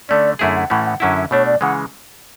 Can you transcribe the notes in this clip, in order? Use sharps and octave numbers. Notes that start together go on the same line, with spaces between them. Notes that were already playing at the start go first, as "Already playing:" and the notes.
D3 A3 C#4 D5
F#2 D3 A3 E4 G#4 E5
F#5
A2 E3 A3 C#4 F#5
F#5
F#2 D3 F#3 C#4 E4 F#5
E5
B2 A3 D4 C#5
D5
C#3 E3 G#3 F#5